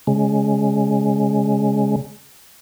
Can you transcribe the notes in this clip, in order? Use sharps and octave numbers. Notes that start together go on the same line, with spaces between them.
C#3 G#3